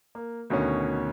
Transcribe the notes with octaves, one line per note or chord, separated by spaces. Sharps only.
A#3
D2 B2 D#3 C#4